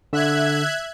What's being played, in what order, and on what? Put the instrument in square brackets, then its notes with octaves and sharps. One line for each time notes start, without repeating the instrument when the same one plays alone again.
[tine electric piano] D3 [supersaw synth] E5 F#6 G#6